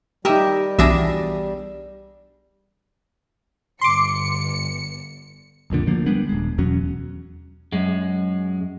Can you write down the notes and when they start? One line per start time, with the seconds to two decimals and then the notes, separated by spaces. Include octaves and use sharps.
0.25 G3 D#4 G4 A#4 D#5 E5
0.79 B1 E3 D4 G#4 E5 A#6
3.81 G1 C6 D6 C#7
5.70 F1 C2 A#2 D3
5.87 D2 D3 F3 A#3
6.06 G3 G#3 B3 D4
6.29 D#1 G#3
6.58 E2 B2 F#3 C#4
7.72 F#2 G#3